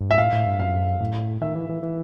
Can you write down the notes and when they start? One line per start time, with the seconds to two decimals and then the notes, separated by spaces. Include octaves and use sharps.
0.01 G2
0.09 G#2 E5
0.18 A2 F5
0.32 A2
0.46 G2
0.59 F#2 F5
1.00 A2
1.41 D#3 E5
1.55 E3
1.69 E3
1.83 E3